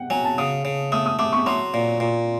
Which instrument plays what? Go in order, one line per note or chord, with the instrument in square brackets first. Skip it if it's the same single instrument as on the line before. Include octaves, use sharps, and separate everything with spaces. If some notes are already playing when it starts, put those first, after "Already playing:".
Already playing: [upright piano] F#5 G5
[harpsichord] F#3 [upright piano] G#5
[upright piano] A5
[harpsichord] C#3 [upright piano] D#6
[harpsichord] C#3
[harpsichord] A3 [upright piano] D#6
[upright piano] D#6
[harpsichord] A3 [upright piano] D6
[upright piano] C#6
[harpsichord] F#3 [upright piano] C6
[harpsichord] A#2
A#2